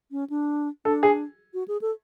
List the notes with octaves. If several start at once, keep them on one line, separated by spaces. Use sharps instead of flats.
C#4
D4
D4 A4
G#4
F#4
G#4
A4